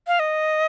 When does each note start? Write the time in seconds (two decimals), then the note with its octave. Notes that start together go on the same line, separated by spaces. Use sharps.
0.07 F5
0.19 D#5